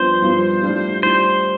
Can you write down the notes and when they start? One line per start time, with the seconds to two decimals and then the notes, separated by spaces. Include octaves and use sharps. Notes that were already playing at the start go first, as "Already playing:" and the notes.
Already playing: G2 F3 B3 D4 F4 C5
0.22 G2 F3 B3 D4 F4
0.63 A2 G3 D4 F4
1.03 A2 G3 D4 F4 C5